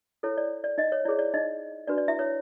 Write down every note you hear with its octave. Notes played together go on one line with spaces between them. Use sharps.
E4 A4 C#5
D5
D5
D#4 D#5
C#5
E4 G#4 C#5 D5
D5
D#4 D#5
D4 F#4 B4 D5
D5
E4 E5
C#5